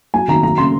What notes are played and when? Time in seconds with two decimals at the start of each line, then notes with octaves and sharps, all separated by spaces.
0.14 F#3 G#5
0.28 D#3 A#5
0.43 F#3 A#5
0.58 C#3 C6